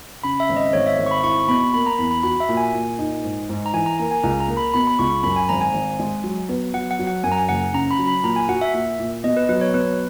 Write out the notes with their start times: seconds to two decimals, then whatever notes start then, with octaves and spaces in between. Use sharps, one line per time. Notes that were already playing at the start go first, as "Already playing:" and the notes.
0.23 C#3 B5
0.40 E5
0.49 G#1
0.56 D#5
0.73 G#1 C#5
0.86 E5
0.99 G#1
1.06 C#6
1.11 B5
1.23 E4 C#6
1.40 C#6
1.48 B2 B5
1.74 A#3 B5
1.86 A#5
1.98 E2 B5
2.11 B5
2.23 F#4 B5
2.40 E5
2.49 A#2
2.57 G#5
2.73 A#2
2.98 D#4
3.24 G#2
3.49 G#2
3.66 A#5
3.73 E3 G#5
3.86 A#5
3.99 A#3 A#5
4.11 G#5
4.23 C#2 A#5
4.40 A#5
4.48 A#3
4.57 B5
4.74 B2 B5
4.87 B5
4.99 C#2 C#6
5.23 F#2 B5
5.36 G#5
5.49 G#1 A#5
5.61 G#5
5.73 G#1
5.99 G#3
6.23 F#3
6.49 B3
6.74 F#3 F#5
6.91 F#5
6.99 F#3
7.07 F#5
7.24 F#2 G#5
7.32 A#5
7.39 G#5
7.49 F#1 F#5
7.74 C#3 A#5
7.91 B5
7.99 F#3
8.07 B5
8.23 A#2 A#5
8.36 G#5
8.48 F#4 F#5
8.61 E5
8.73 A#2 E5
8.99 A#2
9.24 B2 D#5
9.37 B4
9.49 F#3 B4
9.61 C#5
9.74 B2 B4